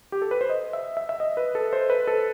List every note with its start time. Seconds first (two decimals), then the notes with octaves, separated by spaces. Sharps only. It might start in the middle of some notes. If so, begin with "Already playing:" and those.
0.12 G4
0.22 A4
0.31 B4
0.41 C5
0.50 D#5
0.73 E5
0.97 E5
1.09 E5
1.20 D#5
1.37 B4
1.55 A4
1.73 C5
1.90 B4
2.07 A4